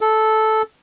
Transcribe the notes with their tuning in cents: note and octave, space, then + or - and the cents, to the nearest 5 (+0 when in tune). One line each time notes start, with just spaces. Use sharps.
A4 -10